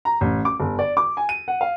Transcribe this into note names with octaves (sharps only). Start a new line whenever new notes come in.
A#5
A1
D6
G1
D5
D6
G#5
D#7
F#5
F5